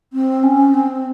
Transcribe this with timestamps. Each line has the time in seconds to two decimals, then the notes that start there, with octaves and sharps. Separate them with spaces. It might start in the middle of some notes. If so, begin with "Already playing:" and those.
0.13 C4
0.43 C#4
0.74 C4